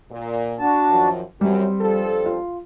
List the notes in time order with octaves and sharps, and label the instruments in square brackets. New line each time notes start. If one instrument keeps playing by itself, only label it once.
[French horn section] A#2
[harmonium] D4 F#4 A5
[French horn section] F#2 D#3 F3
[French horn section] F#2 [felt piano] G3 [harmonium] C4
[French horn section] G2 F3 A4
[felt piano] F4